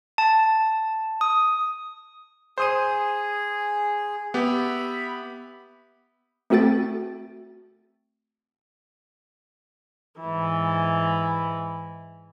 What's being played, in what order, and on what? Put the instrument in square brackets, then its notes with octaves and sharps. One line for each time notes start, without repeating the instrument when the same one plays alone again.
[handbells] A5
D#6
[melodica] G#4 [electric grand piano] C5 D#6 D#7
[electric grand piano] B3 G4 [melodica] E5 B5
[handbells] A3 C4 F#4 A4 G5 A6
[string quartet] G#2 E3